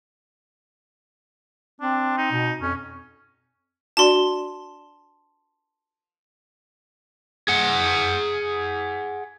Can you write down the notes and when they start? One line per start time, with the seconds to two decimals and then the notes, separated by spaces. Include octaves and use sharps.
1.81 C4 D4
2.17 D#4
2.31 B2
2.62 F2 C#4
3.97 D4 F#4 D5 A5 C6
7.48 G#4 F#5